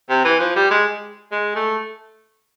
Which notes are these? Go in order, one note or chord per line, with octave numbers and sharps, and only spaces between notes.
C3
E3
F3
G3
G#3
G#3
A3